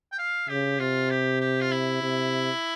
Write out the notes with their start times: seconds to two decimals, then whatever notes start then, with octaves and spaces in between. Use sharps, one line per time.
0.12 G5
0.19 F5
0.49 C#3 G4
0.79 C3 F4
1.10 G4
1.41 G4
1.61 F4
1.72 E4
2.02 C3